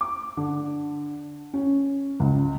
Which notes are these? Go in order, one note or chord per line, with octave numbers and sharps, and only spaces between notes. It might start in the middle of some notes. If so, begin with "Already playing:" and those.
D6
D3
C#4
C#2